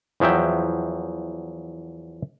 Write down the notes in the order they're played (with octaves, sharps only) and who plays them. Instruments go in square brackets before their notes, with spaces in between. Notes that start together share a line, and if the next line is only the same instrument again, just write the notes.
[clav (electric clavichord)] E2 F3 F#3 E5 G5